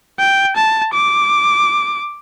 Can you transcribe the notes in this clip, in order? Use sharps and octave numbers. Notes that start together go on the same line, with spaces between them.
G5
A5
D6